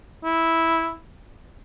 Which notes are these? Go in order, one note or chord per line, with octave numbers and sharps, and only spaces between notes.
E4